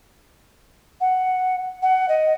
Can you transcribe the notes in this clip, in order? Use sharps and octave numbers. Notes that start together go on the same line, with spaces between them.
F#5
F#5
D#5